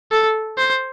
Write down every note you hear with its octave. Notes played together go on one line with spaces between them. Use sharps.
A4
C5